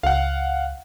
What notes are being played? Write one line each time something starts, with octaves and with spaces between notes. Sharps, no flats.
C#2 F5 F#5